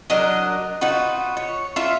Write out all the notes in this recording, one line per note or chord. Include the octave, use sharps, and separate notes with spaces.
F#3 D4 A#4 D#5
D#4 F4 F#4 B4
C#5
F4 E5